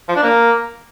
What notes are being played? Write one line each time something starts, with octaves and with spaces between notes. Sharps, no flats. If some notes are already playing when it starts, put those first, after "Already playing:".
F3
D4
A#3